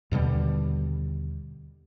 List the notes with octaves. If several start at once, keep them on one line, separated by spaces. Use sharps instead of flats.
D#2 B2 D3 G3